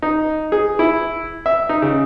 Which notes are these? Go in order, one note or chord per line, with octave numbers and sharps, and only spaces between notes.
D#4
G#4
E4
E5
D#4
C#3